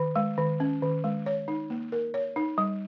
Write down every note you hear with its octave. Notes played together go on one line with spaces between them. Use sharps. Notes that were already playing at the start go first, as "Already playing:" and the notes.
Already playing: D#3
G#3
D#3
C#4
D#3
G#3
C#5
D#4
A#3
A#4
C#5
D#4
G3